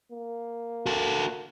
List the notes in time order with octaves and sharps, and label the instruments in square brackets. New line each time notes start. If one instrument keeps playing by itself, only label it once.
[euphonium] A#3
[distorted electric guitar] F#4 A4